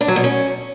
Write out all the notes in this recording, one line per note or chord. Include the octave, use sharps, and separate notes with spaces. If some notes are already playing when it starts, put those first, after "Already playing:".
D4
F#3
B2
C#4